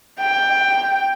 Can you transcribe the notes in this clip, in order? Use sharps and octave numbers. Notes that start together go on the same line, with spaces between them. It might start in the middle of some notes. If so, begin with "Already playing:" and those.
G5